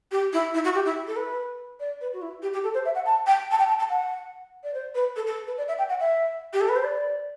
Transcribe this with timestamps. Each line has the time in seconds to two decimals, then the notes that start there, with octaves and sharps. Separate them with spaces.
0.11 G4
0.33 E4
0.54 E4
0.64 F#4
0.74 G4
0.85 E4
1.07 A4
1.16 B4
1.80 D5
2.01 B4
2.13 F#4
2.21 E4
2.42 G4
2.53 G4
2.64 A4
2.74 C5
2.85 E5
2.95 F#5
3.06 A5
3.26 G5
3.51 A5
3.58 G5
3.68 A5
3.79 A5
3.89 F#5
4.63 D5
4.74 C5
4.95 B4
5.16 A4
5.26 A4
5.47 B4
5.57 D5
5.68 E5
5.78 G5
5.89 F#5
6.00 E5
6.53 G4
6.61 A4
6.69 B4
6.76 C5
6.84 D5